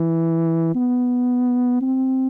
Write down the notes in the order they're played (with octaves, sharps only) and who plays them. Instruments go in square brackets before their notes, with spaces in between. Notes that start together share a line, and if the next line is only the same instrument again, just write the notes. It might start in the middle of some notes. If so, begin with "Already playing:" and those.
Already playing: [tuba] E3
B3
C4